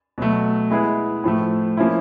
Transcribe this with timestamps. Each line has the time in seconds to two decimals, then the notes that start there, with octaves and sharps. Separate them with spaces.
0.18 B2 F#3 A3
0.70 G#3 B3 E4 G#4
1.24 A2 F3 A3
1.77 F3 A#3 C#4 E4